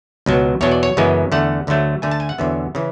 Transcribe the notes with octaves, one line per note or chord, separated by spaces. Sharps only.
C#2 B2 F#3
E2 B2 F#3 C#5
D5
C#5
F#2 C#3 E3 G#3 B3
E2 D3 A3 F#5
D2 D3 F#3 A3
D2 D3 A3 G#5
A5
G#5
F#5
E2 D3 F#3 B3 E5
C#3 E3